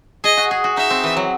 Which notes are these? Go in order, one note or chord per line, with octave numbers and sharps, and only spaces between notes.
G#4 D#5
F#4
G#4
F#4
D#4 E5
C4
E3
F#3